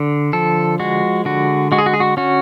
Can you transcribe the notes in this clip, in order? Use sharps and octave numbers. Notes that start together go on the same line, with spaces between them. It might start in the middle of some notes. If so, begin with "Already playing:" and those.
Already playing: D3
F3 A4
G#3 F#4
D3 F#4
G#3 F#4
G#4
F#4
G#4
F#4
C#4 F#4